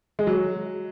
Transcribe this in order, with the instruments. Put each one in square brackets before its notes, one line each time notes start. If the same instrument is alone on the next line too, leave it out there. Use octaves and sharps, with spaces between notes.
[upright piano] G#3
F#3